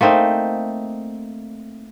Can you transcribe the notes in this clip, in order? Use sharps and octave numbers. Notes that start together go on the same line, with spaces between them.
A3 A#3 C4 D#4